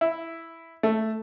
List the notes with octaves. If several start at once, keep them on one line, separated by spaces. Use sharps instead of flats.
E4
A3